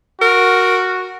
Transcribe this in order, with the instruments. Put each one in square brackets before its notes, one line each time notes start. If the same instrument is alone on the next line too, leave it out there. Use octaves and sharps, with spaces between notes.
[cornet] F#4 [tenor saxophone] A#4